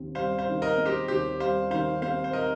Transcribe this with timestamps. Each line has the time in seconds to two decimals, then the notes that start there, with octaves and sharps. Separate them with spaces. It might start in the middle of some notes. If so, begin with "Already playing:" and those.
Already playing: D#2 C4
0.15 G3 C5 F5
0.38 C5 F5
0.47 D#3
0.62 A#4 D#5
0.77 C4
0.85 G4 C5
1.08 D#2 G4 C5
1.40 G3 C5 F5
1.71 D#3 C5 F5
2.02 C4 C5 F5
2.24 C5
2.33 A#4 D#5